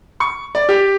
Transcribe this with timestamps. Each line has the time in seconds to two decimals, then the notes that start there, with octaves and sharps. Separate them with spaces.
0.20 C#6
0.55 D5
0.69 G4